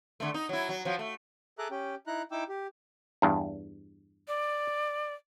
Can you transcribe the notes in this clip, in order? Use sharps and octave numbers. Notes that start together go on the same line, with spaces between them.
D3 A3
D#4
F#3 E4
F#3
F3 F#3
A3
G#4 A4 E5 A#5 D6 F#6
C#4 G4 G5
D#4 E4 A#5 F#6
D#4 E4 G5 D6 E6
G4
E2 G2
D5